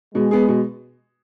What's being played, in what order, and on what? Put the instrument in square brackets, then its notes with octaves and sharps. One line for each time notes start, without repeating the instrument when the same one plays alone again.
[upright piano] B2 [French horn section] G#3
[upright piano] B3 G#4
B2